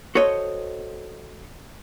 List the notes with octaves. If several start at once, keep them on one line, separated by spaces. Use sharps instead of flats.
F#4 A4 C5 C#5 D#5